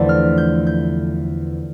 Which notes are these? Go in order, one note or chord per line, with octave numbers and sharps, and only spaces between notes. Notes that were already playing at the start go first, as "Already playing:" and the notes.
Already playing: E2 D3 F3 A3 A6
F6
G6
G6